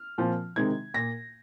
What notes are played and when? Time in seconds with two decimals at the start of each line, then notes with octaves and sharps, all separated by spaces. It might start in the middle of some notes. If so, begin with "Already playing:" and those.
Already playing: F6
0.18 A#2 F3 C4
0.56 C3 D#3 G#3 C4 D#4 G#6
0.94 A#2 A#6